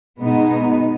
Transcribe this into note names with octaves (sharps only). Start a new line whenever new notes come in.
B2 G#3 B3 D#4